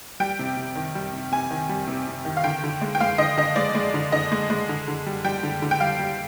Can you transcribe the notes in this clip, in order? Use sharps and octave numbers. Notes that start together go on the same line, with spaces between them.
G3 G5
C3
C3
D#3
G3
C3
C3 G#5
D#3
G3
C3
C3
D#3
F5
D3 G5
D3
G#3
G5
G#3 F5
D3 D#5
D3 D#5
G#3 D5
G#3
D3
D3 D#5
G#3
G#3
D3
D3
G3
G3 G5
D3
D3
G5
G3 F5
G3